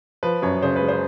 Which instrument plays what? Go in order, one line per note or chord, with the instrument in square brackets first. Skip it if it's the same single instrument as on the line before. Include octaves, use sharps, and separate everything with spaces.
[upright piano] F3 B4
F#2 C#5
C#3 C5
B4
G#3
C5